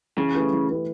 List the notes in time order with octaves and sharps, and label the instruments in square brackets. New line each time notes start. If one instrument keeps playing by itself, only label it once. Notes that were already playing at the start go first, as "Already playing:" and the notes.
[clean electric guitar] C#3 [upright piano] E3
[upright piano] A3 E4 G4 B4
E3
A3 E4 G4 B4